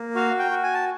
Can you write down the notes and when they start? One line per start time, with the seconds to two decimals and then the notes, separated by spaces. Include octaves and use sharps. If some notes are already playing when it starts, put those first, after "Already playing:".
Already playing: A#3
0.15 F#4 F5
0.39 G5
0.51 F#4
0.63 G#5
0.74 A5